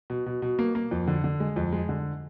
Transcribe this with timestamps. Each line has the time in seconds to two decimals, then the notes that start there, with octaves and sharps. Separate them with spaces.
0.10 B2
0.26 B2
0.42 B2
0.59 A#3
0.75 A#3
0.91 F2
1.07 D3
1.24 D3
1.40 G#3
1.56 F2
1.73 G#3
1.89 D3